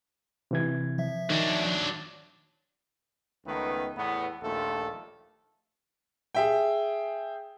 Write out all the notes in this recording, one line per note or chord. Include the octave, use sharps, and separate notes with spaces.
C3 E3 G#6
F3 E5
D#3 F#3 D4
C#2 D#3 A3 B3 B4
E2 A2 B3
A#1 D#2 A3 F4 A4
G#4 E5 G5